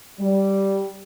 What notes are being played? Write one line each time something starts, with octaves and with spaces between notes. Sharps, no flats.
G3